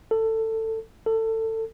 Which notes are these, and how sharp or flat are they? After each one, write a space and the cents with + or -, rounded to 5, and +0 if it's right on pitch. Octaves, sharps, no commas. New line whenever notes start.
A4 +20
A4 +25